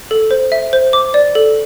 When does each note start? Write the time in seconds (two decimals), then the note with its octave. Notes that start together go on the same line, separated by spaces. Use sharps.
0.11 A4
0.31 C5
0.52 E5
0.73 C5
0.93 D6
1.14 D5
1.35 A4